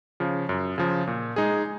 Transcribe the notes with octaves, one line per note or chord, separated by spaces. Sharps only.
C#3 F3
F#2
C#3 F3
A#2
G#3 D#4 G#4